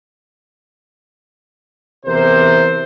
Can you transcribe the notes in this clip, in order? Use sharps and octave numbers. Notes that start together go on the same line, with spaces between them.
E2 C3 A#4 C5